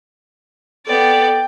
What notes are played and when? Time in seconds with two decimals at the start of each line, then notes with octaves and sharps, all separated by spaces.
0.87 B3 A4 D5 G5 G#5